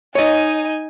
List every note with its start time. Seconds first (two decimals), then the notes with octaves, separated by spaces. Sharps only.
0.15 D#4 C#5 D#5 G#5